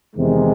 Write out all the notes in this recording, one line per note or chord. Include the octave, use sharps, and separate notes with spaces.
E2 C3 D#3 G#3